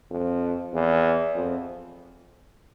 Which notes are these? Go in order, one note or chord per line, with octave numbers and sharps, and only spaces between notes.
F2
E2
F2